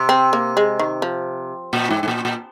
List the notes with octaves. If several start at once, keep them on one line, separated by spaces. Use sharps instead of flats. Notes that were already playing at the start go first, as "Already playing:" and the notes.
Already playing: C3
C4
A#3
G#3
D#3
F3
A#2
G#2
G#2
A#2
A#2